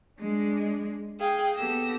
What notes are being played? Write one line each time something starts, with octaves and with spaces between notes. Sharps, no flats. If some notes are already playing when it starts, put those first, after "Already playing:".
G#3 D4
G#4 F5 G5
B3 G4 A4 E6 A#6